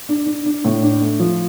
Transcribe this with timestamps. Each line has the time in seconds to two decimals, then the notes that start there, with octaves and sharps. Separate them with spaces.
0.09 D4
0.26 D4
0.46 D4
0.65 A2
0.83 D4
1.02 A3
1.20 F3